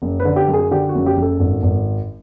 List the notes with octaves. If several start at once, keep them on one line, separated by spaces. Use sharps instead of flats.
F#1
B4
D3
G4
F#2
G#4
D3 G4
F#4
F#1
G4
F#1
A4
G#1
G#1